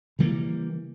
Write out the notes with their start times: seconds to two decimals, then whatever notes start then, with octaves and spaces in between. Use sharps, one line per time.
0.19 C#3 E3 G3 A#3